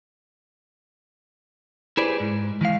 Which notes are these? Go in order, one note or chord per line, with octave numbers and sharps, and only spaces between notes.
E4 G4 G#4 B4 C5 D5
G#2
D#3 E3 G#3 F5